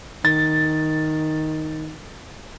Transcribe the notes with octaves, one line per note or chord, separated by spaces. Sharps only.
D#3 A6